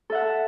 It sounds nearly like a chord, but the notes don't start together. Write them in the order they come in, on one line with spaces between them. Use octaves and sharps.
A4 E5 F#5